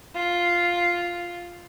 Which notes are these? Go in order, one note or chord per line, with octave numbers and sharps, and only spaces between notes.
F4